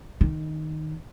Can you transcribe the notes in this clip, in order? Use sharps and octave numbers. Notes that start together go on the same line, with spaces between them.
D#3